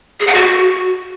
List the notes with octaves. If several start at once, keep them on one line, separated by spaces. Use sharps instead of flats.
G#4
F#5
F#4